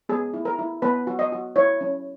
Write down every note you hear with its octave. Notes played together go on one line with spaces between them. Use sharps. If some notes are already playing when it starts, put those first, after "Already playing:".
B3 G#4
E4
A#4
E4
B3 B4
F#4
D#5
F#4
E4 C#5
C#4